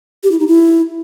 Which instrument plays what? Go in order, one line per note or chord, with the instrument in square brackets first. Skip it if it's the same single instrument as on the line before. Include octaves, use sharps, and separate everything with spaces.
[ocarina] G4
E4
D#4
E4